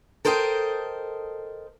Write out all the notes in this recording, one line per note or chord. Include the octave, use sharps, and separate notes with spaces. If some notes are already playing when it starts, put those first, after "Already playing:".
A4 A#4 C5 D#5 F5 G5